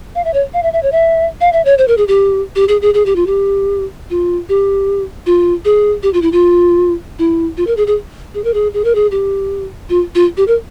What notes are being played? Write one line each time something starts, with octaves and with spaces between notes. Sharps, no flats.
F5
E5
C#5
F5
E5
E5
C#5
E5
F5
E5
C#5
C5
A#4
G#4
G4
G4
G#4
G#4
G#4
G4
F4
G4
F4
G4
F4
G#4
G4
F4
E4
F4
E4
F4
A#4
G#4
G#4
G#4
A#4
G#4
G#4
A#4
G#4
G4
F4
F4
G4
A#4